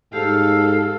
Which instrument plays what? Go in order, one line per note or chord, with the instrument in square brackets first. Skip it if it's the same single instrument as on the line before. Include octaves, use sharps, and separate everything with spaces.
[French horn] G#2 [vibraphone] G4 [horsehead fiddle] A4 [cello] F5